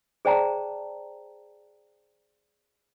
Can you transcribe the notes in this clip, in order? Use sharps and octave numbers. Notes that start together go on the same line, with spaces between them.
G#4 C5 D5 G5 A5 A#5